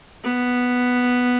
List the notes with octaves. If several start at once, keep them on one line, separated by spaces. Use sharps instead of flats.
B3